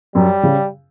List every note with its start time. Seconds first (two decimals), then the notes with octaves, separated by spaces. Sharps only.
0.15 F#2 G3
0.43 C#3